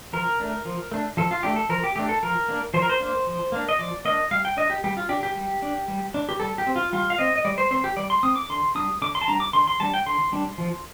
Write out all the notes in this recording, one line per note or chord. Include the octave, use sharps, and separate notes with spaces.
F3 A#4
A3 D4
F3
A3 D4
F3 A4
F4
A3 D4 G4
A4
F3 A#4
G4
A3 D4 G4
A4
F3 A#4
A#3 D4
F3 C5
A#4
C5
A#3 D4
F3
A#3 D4
D#5
F3 D5
A#3 D4 D#5
G3 F5
G5
D4 D#5
G4
G3 G4
F4
D4 G4
G4
G3
D4
G3
D4
G4
G3 A4
G4
C4
F4
G3 F4
F5
C4 D#5
D#5
G3 D5
C5
C4 C5
G4
G3 D5
C6
C4 D#6
D6
D3 C6
G3 D4 D#6
D3 D6
C6
A5
G3 D4 A#5
D6
D3 C6
C6
G3 D4 A5
G5
D3 C6
G3 D4
F3